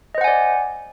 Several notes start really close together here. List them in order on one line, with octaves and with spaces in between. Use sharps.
D#5 C5 F#5 G#5 D5